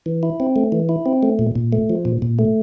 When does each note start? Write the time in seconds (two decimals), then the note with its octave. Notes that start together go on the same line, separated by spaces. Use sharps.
0.06 E3
0.23 E4
0.40 C4
0.56 A3
0.72 E3
0.89 E4
1.06 C4
1.23 A3
1.39 A#2
1.56 A#2
1.73 A3
1.90 F3
2.05 A#2
2.22 A#2
2.39 A3